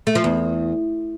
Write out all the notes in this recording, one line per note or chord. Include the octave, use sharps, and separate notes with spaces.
A3
F3
E2